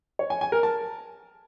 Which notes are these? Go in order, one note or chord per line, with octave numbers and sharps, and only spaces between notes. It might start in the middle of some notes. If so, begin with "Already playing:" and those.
C#5
G#5
G#5
A#4
A5